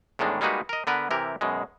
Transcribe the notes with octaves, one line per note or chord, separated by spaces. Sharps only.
E2 A2 D#3 G#3 D4
G3 G#3 A#3 D#4 F#4 B4
A#4 D#5
D3 B3 A#4 B4
C3 E3 G4 A#4
F#2 B2 G#3